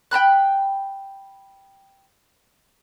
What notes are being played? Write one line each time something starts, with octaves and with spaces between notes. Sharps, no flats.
G5 A5 B5 F#6